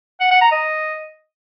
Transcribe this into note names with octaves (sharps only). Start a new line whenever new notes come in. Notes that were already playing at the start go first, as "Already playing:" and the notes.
F#5
F#5
A#5
D#5